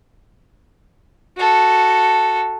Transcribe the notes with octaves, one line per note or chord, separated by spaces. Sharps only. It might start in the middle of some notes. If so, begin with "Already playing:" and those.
F#4 A4